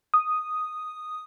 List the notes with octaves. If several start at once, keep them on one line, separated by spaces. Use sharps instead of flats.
D#6